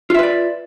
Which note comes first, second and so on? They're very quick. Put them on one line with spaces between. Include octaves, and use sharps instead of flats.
F4 E5 B4 D5